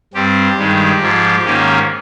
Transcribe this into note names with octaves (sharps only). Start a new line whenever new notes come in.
G2 G3 C4 G4
G2 D#3 G#3
G#2 F3 G#3
G#2 D#3 A#3 C#4